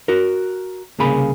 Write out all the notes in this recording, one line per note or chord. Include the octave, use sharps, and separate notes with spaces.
F#4 A#4
C2 C#3 A#3 G#4 B5